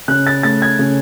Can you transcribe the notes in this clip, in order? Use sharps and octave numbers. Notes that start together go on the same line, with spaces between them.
C#3 F#6
A6
A3 A6
G#6
C#3